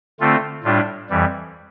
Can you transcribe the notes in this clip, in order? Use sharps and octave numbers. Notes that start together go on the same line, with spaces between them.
D3 A3 C4 F4
A2 G3 D4 F4
F2 E3 G3